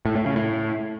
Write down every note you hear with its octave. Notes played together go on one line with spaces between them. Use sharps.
A2
A2
C#3
A2